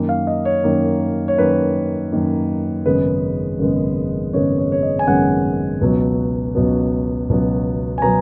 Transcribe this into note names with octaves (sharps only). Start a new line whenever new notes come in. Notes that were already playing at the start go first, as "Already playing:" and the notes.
Already playing: F#2 D#3 A#3
F5
D#5
C#5
F#2 D#3 A#3
C#5
F#2 D#3 A#3 B4
F#2 D#3 A#3
G#1 F#2 C#3 G#3 B3 B4
G#1 F#2 C#3 G#3 B3
G#1 F#2 C#3 G#3 B3 C#5
C#5
C#5
D#5
G#5
G#1 F#2 C#3 G#3 B3 F#5
C#2 B2 F#3 B3
C#2 B2 F#3 B3
C#2 B2 F#3 B3
G#5
B2 F#3 B3 A#5